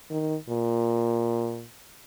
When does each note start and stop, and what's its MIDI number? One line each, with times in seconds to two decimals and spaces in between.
0.11 0.35 51
0.49 1.65 46